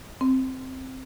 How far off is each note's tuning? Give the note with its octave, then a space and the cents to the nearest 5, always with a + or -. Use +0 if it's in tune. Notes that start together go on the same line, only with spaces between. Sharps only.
C4 +0